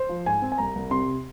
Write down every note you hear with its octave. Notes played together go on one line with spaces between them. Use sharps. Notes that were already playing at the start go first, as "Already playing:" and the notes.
Already playing: C5
F3
G#2 G#5
C4
G#5
C2 A#5
C2
C3 C6